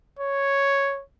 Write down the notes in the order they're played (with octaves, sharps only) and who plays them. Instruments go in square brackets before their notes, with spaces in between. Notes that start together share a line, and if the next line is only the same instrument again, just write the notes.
[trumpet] C#5